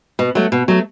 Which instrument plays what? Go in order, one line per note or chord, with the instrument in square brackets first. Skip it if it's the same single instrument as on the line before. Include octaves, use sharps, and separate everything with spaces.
[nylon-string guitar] B2
F#3 A3
B2
F#3 A3